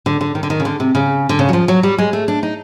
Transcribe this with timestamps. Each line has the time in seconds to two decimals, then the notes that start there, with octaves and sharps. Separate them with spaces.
0.06 D3
0.21 D3
0.35 D#3
0.43 D3
0.50 D#3
0.60 C#3
0.65 D3
0.80 C3
0.95 C#3
1.29 D3
1.39 C#3
1.49 F#3
1.53 F3
1.68 F#3
1.83 G3
1.98 G#3
2.13 A3
2.28 D4
2.43 D#4